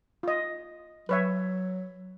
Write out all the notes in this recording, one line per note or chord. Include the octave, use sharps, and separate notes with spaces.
F4 D#5
F#3 B4 C#5 E5